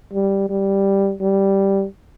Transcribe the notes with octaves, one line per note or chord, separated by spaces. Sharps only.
G3
G3
G3